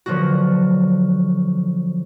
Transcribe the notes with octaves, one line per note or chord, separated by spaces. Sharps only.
D3 F3 F#3 B3 F#4